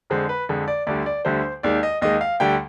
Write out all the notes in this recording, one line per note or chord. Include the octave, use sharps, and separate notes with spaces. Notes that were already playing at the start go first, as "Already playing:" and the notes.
F2 D3 G#3 C5
B4
F2 D3 G#3
D5
D2 D3 G3 D5
D5
D2 D3 G3 C5
D#2 D#3 G#3 D5
D#5
D#2 D#3 G#3 D#5
F5
D2 D3 G3 G5